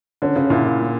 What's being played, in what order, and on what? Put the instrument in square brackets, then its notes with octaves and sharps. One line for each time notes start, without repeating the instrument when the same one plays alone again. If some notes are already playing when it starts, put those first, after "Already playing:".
[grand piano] D3 [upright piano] C#4
[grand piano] C#3 [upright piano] C#4
[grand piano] A#2 D3 [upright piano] E4
[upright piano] E4
A#3